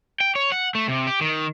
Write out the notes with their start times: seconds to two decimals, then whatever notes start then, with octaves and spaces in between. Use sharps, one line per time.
0.20 G5
0.35 C#5
0.52 F#5
0.75 A3
0.88 C3
1.07 G4
1.21 D#3